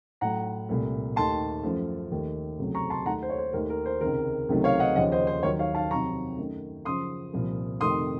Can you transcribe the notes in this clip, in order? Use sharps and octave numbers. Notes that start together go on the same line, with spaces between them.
A2 F#3 A3 F#5 A#5
C2 A#2 A3
D#2 D#3 A3 A5 C6
F#2 F3 A3
D#2 D#3 A3
C#2 C3 F#3 A3
A#5 C#6
A5 C6
D#2 D#3 A3 F#5 A#5
C5
C#5
C5
D#2 D#3 A3 A#4
A#4
C5
C#2 C3 D#3 A#4
C#2 C3 D#3 F#3 A3
C#5 F5
D#5 F#5
D#2 C#3 F3 D#5 F#5
C5 D#5
C5
D#2 D#3 F#3 A#4 C#5
C#5 F5
F5 A5
F2 C3 D#3 F#3 A#5 C#6
F#2 D#3 A3
F#2 C#3 F3 C6 D#6
C2 A#2 F3
F2 C3 D#3 A3 C6 D#6